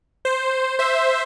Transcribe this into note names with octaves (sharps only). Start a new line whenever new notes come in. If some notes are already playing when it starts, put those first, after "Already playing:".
C5
C5 E5